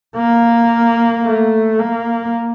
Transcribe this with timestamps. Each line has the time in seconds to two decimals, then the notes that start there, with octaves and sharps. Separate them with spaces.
0.17 A#3
1.25 A3
1.79 A#3